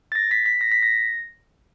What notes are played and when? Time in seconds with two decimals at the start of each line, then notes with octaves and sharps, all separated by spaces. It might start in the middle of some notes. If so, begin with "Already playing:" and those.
0.12 A6
0.15 A#6
0.31 B6
0.46 B6
0.61 A#6
0.72 B6
0.83 A#6